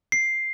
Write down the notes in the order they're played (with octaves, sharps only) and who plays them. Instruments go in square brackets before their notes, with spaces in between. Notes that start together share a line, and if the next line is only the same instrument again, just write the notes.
[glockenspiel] C7